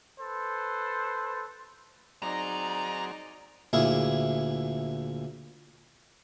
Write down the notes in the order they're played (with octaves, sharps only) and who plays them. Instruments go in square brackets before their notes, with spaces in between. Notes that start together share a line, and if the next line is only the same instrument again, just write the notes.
[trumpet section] A4 B4 C5
[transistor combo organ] F#3 C4 G#4 [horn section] D#4 D5 [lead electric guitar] A#5
[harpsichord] D2 A#2 E4 G#4